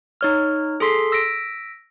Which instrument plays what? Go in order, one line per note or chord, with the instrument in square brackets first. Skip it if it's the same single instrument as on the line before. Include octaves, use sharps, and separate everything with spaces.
[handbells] D#4 C#5 F6
G#4 A4 C6 B6 C7
E6 A#6 B6 D7